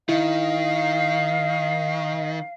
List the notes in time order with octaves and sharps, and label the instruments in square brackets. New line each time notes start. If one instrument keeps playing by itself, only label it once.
[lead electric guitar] D#3 [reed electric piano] E4 [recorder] D#5 [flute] F5